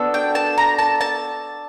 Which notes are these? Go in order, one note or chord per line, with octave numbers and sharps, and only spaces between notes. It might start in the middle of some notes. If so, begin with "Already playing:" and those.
Already playing: B3 D4 F#4 A4
G5
A5
A#5
A5
A5